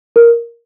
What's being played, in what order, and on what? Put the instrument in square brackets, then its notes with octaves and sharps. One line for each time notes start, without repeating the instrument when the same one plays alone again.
[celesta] A#4